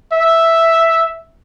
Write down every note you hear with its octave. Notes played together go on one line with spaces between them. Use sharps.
E5